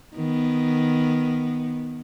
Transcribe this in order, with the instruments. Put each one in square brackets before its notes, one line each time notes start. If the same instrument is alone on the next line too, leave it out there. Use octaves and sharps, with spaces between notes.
[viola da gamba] D#3 B3